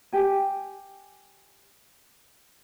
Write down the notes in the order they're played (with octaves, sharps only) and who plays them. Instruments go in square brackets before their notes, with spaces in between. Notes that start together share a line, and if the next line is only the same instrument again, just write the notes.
[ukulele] G4 G#5